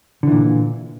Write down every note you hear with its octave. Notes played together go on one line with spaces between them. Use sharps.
A#2 D3 E3